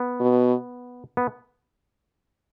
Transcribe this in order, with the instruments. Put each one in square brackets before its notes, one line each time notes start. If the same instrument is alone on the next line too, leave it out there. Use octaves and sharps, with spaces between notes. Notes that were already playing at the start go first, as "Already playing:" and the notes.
Already playing: [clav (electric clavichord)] B3
[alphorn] B2
[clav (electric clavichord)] B3